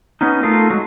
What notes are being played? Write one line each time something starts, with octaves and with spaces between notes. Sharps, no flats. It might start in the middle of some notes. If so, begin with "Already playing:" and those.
B3 C#4 D#4
A3 D#4 F4 A4 A#4
F#3 G#3